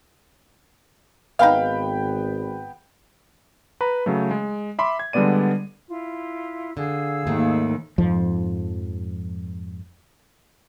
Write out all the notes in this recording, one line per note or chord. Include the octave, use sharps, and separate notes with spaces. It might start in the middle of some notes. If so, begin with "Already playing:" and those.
G#1 B3 D#4 F5 G5 B5
B4 A#5 B5
C#3 F#3 A3
G#3
E5 B5 C6 D6
G#6
D3 G3 G#3 B3 D5 D#7
E4 F4
D3 G#4 F5 E6
D#2 G#2 A3
F2 G#2 F3